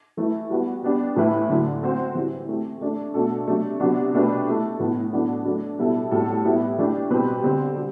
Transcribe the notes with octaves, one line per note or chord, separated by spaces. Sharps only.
E3 A3 E4 B4
G3 B3 F#4 B4
G3 B3 D4 G4
A2 E3 A3 E4 B4
D3 F#3 A3
A3 C4 F#4 C5
E3 G3 C4
A3 C4 G4
A3 D4 A4
B2 A3 D4 F#4 A4
C3 F#3 A3 D4
C3 F#3 B3 D4 F#4
B2 A3 D4 G4 B4
A3 E4 A4
A2 E3 B3
F#3 B3 D4 F#4 A4
F#3 A3 D4 A4
B2 G3 B3 E4 A4
A2 G3 C4 F#4 A4
G3 B3 E4 B4
E3 A3 D4 G4
B2 G3 C4 G4 B4
D3 G3 C4
G3